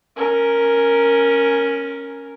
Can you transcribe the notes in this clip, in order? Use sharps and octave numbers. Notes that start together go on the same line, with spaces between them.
C#4 A#4